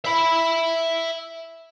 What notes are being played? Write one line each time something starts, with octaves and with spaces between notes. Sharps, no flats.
E5 B5